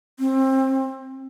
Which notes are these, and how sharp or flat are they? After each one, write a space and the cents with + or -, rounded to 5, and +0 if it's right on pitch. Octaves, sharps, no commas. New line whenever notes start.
C4 +25